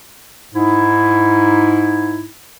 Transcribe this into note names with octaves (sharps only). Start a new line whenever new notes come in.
G#2 D#4 E4